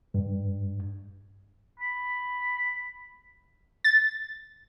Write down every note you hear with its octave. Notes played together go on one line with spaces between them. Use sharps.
G2
B5
A6